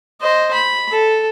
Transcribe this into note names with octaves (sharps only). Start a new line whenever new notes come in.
C5 D#5
B5
A4